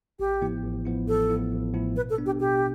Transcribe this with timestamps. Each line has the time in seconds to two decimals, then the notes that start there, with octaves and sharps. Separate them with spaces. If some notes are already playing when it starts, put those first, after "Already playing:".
0.19 A1 G4
0.42 A2 F3 B3 E4
0.63 A1
0.85 A2 F3 B3 E4
1.08 A1 A4
1.30 A2 F3 B3 E4
1.52 A1
1.74 A2 F3 B3 E4
1.96 B2 B4
2.10 A4
2.18 B3 D4
2.26 G4
2.40 B2 G4